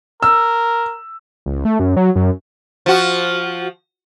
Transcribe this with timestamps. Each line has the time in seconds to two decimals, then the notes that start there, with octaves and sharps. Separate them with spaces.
0.23 A#4 E6
1.46 C#2
1.65 A3
1.80 F#2
1.97 F#3
2.16 F#2
2.86 F3 F#4